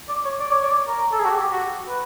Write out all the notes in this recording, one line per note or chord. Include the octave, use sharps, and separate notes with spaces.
D5
C#5
D5
C#5
D5
A#4
A4
G#4
F#4
G4
G4
F#4
B4